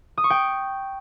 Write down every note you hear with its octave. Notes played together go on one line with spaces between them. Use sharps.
D#6
C#6
G5